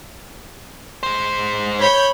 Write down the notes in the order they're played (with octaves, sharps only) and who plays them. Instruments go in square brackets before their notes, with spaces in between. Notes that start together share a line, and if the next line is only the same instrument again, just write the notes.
[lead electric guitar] G#3 C5
[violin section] C#5 B5 G6